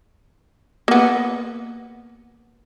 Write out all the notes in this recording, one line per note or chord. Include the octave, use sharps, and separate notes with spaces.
A#3 B3